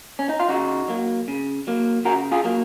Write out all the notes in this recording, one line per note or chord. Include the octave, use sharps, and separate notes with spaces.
C#4
D#4
F4
C#3 D#4 F#4
F#3 A#3
C#3
F#3 A#3
C#3 F#4 A#4
F4 G#4
F#3 A#3